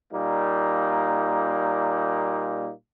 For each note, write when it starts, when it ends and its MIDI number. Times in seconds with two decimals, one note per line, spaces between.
0.13 2.72 46
0.13 2.72 55
0.13 2.72 58
0.13 2.72 63